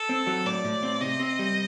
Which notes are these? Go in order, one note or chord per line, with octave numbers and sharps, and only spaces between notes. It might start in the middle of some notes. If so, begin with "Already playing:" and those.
Already playing: A4
C4
F#3
A2 D5
A2
C4
C3 D#5
C4
G3